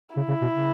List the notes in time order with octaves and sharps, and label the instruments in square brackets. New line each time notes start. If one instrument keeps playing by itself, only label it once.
[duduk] C#3 [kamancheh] E4
[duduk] C#3
B2
C#3